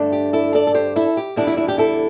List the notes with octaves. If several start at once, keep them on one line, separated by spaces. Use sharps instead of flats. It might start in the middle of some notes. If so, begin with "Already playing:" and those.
Already playing: G2 D3 A3 D4
G4
E4 A4
A4 D5
A4
G4 C5
E4 A4
G4
E2 D3 G3 D4 E4
E4
E4
G4
E4 A4